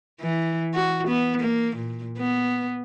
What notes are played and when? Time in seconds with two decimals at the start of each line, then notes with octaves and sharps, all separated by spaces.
0.21 E3
0.74 F#4
1.07 B3
1.40 A#3
1.76 A#2
2.18 B3